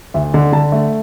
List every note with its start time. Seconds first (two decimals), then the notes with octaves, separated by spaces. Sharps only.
0.14 D2 E5
0.34 D3
0.52 D3 A5
0.72 A3